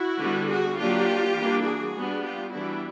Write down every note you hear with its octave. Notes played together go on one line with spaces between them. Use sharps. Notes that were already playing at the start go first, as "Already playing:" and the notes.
Already playing: E4 F#4
D3 G3 B3
F#4 G#4
F#3 A#3 D4 F4 G4
E3 G3 A#3 D4
F#4 G#4
G3 B3 D4
F4 G4
E3 G3 B3 D4 E4 F#4